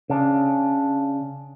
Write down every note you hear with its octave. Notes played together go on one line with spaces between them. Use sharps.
C#3 D4